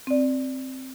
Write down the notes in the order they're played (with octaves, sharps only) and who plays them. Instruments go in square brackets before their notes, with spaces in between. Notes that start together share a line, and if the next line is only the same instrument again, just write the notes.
[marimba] C4 D5